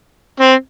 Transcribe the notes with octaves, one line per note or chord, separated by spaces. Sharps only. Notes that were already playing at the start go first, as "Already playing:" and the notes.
C4